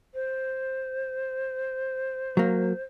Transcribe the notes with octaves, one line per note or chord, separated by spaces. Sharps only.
C5
F#3 A#3